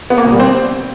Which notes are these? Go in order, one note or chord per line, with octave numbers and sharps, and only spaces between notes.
B3
A#3
B2
G3
C4